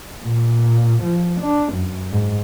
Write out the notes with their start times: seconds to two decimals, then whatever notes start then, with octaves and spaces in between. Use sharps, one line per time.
0.24 A#2
1.04 F3
1.41 D4
1.73 F#2
2.11 G#2